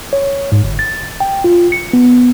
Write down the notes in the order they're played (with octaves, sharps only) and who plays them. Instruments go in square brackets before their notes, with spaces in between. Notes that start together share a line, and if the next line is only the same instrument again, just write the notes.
[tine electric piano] C#5
G#2
G1
A6
G5
F4
C#7
B3